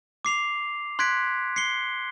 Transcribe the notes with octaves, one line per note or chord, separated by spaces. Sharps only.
D6 C7 F7
C6 F#6 G#6 B6 D7
C7 C#7 G7